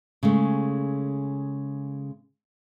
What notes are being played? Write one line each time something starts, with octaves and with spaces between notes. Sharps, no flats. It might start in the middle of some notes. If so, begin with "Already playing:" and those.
C#3 G#3 A3